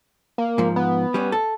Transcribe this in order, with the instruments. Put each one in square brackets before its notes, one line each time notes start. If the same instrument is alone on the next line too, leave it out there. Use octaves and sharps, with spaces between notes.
[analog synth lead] A#3
[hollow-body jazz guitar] G#2 F3
[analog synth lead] B3
[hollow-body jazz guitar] G3 C#4
A4